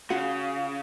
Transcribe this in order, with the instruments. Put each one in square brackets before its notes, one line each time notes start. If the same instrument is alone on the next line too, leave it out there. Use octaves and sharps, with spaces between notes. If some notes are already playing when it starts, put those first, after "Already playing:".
[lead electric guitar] C#3 [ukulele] F4 F#4 F#5